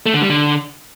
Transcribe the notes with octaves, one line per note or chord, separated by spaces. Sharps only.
A3
D3
G3
D3